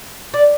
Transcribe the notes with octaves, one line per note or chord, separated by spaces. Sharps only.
D5